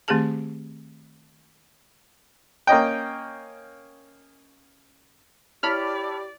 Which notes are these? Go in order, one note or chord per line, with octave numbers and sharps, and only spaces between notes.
D#3 A3 C4 G4 G#4 A5
A#3 C#4 D#5 G5
E4 G4 C#5 D5 A5 B5 F6